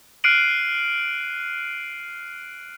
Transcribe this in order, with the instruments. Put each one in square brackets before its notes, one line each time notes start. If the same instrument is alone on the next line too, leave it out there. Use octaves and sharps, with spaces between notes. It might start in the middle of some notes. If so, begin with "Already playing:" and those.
[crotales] F6 F#6 C7 D7 D#7 F#7